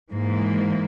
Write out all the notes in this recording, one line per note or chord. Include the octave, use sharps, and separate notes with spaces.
G#2 E3 A#3